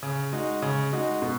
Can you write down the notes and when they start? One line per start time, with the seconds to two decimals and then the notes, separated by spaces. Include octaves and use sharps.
0.03 C#3
0.33 G#3 D#4 F#4
0.62 C#3
0.92 G#3 D#4 F#4
1.22 B2